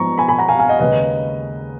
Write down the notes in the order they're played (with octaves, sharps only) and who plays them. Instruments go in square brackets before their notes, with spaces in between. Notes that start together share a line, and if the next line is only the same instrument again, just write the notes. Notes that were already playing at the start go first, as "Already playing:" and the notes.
Already playing: [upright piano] G#2 F3 B3 A#5 C#6
G#5 B5
G#5 B5
F#5 A#5
F5 G#5
F5 G#5
D#5 F#5
D#2 C#3 G#3 C#4 B4 D#5